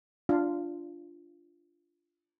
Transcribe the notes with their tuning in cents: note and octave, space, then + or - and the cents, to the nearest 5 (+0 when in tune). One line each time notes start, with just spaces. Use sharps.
D4 +0 F4 -10